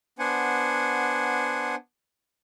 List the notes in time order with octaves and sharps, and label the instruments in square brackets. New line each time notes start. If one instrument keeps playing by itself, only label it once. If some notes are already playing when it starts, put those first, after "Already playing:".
[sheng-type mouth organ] B3 D4 C5 F#5 G#5